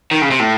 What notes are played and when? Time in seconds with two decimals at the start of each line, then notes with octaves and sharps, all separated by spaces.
0.11 D#3
0.22 C#3
0.31 C3
0.40 A2